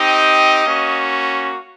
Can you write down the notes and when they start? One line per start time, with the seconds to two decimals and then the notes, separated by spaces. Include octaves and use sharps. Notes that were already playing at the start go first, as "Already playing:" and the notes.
Already playing: C4 D#4 G4 D#5
0.65 A#3 C#4 F#4